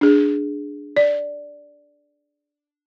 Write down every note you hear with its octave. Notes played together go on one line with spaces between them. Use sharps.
D4 G#4
D5